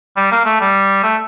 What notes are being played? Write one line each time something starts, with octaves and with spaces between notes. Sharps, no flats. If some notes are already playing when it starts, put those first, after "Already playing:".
G3
A#3
A3
G3
A3